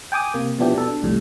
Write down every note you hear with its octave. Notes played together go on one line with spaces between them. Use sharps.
G5 G#5 D6 D#6
C3 A#3
B2 F3 B3 D4 E4 G4
B2 A4
D4
C2 F2 A2 G3